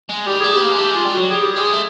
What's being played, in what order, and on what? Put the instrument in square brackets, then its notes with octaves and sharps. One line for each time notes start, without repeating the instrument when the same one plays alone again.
[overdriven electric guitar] G#3
[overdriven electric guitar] G3 [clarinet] G4
[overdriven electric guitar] A3 [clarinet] G#4
[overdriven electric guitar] B3 [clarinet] G4
[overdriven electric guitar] A#3
G#3
[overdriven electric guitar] A3 [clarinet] G4
[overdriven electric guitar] G#3 [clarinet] F4
[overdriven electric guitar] G3
[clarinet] F#4
[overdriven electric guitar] F#3
[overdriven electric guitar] G3 [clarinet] G#4
[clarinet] G4
[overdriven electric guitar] G#3 [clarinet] G#4
[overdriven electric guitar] A3